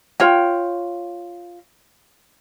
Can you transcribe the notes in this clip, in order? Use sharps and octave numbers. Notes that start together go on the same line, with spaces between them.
F4 C#5 G5